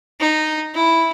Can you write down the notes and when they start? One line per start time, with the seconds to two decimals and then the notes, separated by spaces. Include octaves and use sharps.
0.20 D#4
0.74 E4